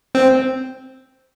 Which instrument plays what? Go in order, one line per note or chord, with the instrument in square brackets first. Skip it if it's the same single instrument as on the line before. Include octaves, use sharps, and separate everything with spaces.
[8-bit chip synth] C4